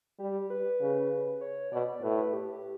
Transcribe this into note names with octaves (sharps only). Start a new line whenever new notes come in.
G3 G4
B4
C#3
C#5
B2 D5
A2 B4
B4
G4